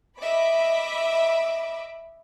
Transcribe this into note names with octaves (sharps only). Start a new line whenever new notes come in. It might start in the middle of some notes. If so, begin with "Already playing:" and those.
D#5 E5 B5 D6